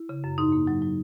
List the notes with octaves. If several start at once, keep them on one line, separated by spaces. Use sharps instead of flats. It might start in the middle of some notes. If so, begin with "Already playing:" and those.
Already playing: E4
C#3
F#2
G#2 D#4
A#3
F#3
F#3